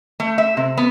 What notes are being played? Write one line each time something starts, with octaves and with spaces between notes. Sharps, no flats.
A3
E5
C3
B3